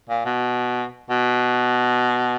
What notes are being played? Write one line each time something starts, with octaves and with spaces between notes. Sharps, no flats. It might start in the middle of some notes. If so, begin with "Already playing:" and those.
A#2
B2
B2